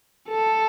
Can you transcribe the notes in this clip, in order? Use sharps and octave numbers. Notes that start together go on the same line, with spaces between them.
A4